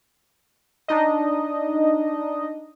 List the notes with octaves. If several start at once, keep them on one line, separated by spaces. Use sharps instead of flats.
D4 D#4 D#5